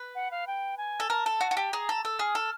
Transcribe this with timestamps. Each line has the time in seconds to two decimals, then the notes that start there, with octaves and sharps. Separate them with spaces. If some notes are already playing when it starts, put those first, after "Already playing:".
Already playing: B4
0.15 F#5
0.31 F5
0.47 G5
0.78 G#5
1.00 A4
1.10 A#4 A5
1.26 A4
1.41 F#4
1.51 F#4
1.57 G4
1.72 G#4 A#5
1.89 A4
2.04 A4 E6
2.19 G#4 F6
2.35 A4